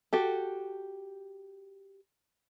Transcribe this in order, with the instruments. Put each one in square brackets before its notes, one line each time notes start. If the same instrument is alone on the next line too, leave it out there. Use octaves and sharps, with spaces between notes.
[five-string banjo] F#4 G4 A4